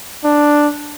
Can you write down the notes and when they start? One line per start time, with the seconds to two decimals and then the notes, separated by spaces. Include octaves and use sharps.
0.23 D4